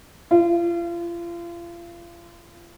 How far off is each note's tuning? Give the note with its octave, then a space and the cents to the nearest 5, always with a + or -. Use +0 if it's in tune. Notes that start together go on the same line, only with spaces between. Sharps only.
F4 -35